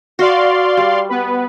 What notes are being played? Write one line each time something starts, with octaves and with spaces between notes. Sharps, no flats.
F#4 D5 F5 C6
G3
B3 B4